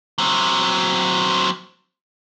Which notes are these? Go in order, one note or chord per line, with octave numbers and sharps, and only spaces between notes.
F#3 C4